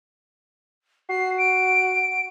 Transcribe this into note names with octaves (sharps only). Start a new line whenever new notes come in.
F#4 C7
D7